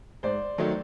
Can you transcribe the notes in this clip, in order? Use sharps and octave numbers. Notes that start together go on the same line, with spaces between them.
G#2 C5 D5
D#3 F#3 A3